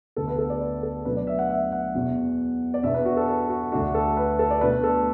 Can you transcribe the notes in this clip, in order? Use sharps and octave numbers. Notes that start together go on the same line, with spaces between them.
D2 D3 B3 D4 A4
B4
A4
D5
B4
A4
B2 F#3 A3 D4 B4
D5
E5
F#5
E5
F#5
E2 B2 B3
D5
E2 B2 B3 D4 E5
B4
F#4
A4
A4
F#4
D2 D3 A3 D4 F#4
A4
B4
A4
D5
B2 A3 D4 B4
A4